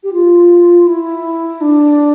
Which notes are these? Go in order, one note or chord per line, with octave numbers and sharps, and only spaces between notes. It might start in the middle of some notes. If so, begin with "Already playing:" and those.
G4
F4
E4
D4